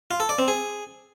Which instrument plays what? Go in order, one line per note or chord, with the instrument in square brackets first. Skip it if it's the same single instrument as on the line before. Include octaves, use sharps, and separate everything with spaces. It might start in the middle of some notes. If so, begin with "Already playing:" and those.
[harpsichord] F4
A4
D5
C4
G#4